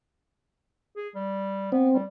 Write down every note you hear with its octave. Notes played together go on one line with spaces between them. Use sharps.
G#4
G3
B3 C4
G3